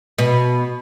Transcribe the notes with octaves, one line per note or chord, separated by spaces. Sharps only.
B2